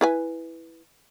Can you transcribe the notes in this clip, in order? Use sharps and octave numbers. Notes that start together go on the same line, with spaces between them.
E4 B4 G#5